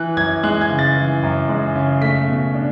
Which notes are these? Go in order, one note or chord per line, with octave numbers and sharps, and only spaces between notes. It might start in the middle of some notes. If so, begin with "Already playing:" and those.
Already playing: E3 F#6
F#2 G#6
G#3 F#6
G#6
C#3
A6
E3
F#2
G#3
C#3
A3 B6
B2
D4